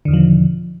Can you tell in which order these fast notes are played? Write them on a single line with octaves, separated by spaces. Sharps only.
D3 E2 D#3 F3 B2